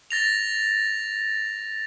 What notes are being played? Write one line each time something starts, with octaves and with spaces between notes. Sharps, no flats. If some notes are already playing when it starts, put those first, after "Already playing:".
A6 A#6 F7